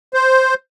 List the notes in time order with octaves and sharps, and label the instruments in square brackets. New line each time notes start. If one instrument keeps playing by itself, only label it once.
[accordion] C5